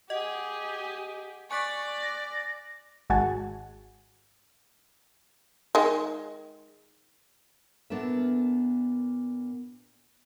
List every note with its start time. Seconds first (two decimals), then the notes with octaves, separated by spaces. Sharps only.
0.10 G4 G#4 D#5 F#5
1.51 D5 G#5 C#6 F#6 B6
2.03 A#6
3.10 G#1 G#3 F#4 F#5 G#5 A5
5.75 D#3 G#3
7.90 A#2 B3 D4 A4 A#4 E5